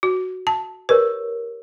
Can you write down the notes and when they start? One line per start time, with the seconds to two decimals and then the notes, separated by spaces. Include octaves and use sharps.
0.03 F#4
0.47 A5
0.89 G4 A#4 B4 C#5